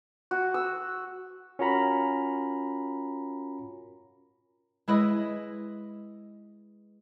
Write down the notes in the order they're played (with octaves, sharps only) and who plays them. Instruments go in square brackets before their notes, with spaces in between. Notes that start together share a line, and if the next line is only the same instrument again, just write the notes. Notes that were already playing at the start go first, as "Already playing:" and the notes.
[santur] F#4
E6
[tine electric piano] C#4 F4 F#4 A#4 A#5 B5
[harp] G#3 E4 B4 D#5